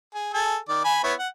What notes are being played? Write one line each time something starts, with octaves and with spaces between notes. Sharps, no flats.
G#4
G#4 A4
D#3 D5
G#5 B5
B3 E4 C#5
F#5